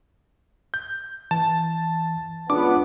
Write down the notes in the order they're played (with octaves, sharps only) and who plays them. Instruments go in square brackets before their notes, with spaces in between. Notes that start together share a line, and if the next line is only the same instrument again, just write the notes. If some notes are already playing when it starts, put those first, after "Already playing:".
[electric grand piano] G6
[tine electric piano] E3 [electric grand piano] A5
[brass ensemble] C#2 B3 [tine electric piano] D4 F4 [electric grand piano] D6